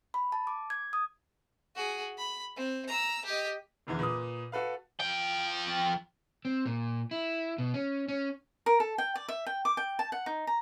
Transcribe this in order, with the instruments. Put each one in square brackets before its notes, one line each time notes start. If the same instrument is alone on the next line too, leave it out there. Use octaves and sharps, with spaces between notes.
[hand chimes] B5
A5
D6
G#6
D#6
[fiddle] F#4 G#4
B5
C4
A#5 E6
G4 D#5
[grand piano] F#1 E2 D3 E3
A#2 B4 D6 D#6
F#4 A4 B4 F5
[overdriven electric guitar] F3 G5
[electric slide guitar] C4
A#2
E4
B2
C#4
C#4
[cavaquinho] A#4
A4
G5
D5
E5
G5
D6
G5
A5
F#5
D#4
A#5